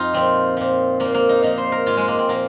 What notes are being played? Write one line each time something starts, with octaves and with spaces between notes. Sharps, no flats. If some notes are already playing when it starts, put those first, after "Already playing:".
Already playing: F2 D#4 F4
A#2 F3 C4
A#2 F3
A#2 F3 A#3
A#3
D#4
A#2 F3 D#4
C5
A#4
G#2 F3 F4
G#3
A#3
C4
A#2 F3 A#3